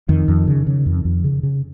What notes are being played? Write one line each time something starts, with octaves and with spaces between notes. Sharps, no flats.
F2 D#3
F2
C#3
C#3
F2
F2
C#3
C#3